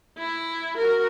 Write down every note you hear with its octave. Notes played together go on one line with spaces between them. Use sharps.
E4
F#4 A#4